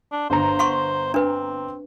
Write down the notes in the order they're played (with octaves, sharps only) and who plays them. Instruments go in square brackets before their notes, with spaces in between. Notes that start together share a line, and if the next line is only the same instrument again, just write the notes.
[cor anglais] D4
[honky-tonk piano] G1 A#5 [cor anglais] C5
[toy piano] F#5 C6 C#6
[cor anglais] C4 [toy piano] D4 B4